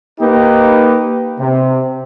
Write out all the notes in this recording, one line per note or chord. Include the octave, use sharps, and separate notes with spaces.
A#3 D#4 G4 B4
C3